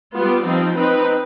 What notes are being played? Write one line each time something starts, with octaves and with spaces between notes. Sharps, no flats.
G3 B3 F4
F3 C4 D#4
C4 D#4 B4